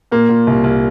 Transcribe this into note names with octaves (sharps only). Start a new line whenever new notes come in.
A#2 A#3
A#2
C2
C2